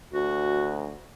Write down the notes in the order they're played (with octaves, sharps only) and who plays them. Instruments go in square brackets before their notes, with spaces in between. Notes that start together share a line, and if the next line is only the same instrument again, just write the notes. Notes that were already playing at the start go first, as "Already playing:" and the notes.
[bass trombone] D2 [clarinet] F#4